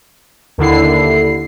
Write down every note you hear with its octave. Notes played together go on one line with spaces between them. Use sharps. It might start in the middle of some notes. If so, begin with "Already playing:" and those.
D#2 D3 E4 C7